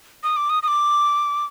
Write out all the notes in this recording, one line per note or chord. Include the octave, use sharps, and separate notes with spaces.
D#6
D6
D#6
D#6
D6